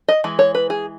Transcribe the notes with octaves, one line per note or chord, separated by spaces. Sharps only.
D#5
E3 G#3
C#5
B4
G#4